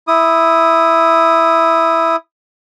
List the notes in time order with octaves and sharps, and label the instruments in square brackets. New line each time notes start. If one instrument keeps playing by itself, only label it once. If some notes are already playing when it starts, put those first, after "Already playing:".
[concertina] E4 D#6